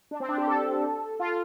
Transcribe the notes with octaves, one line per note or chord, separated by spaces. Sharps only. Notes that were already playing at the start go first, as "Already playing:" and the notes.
D4
C4
D4
G4
A4
F4